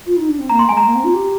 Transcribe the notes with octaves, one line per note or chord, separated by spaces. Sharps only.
F4
D#4
D4
C4
A#3 A#5
C6
G#3 G#5
A#5
A#3
C4
F4
G4